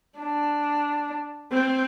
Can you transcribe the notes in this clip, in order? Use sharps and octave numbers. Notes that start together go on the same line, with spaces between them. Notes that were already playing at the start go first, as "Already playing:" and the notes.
D4
C4